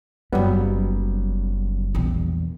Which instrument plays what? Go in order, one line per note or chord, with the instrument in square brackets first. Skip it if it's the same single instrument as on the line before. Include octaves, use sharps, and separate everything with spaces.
[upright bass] F#1 C#4 [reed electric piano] F#3 G3 B3
[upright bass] A#1 E2